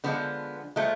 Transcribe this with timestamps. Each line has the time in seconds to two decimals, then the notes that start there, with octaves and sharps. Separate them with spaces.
0.04 D3 F3 G#3 B3
0.76 A#2 F3 G#3 A3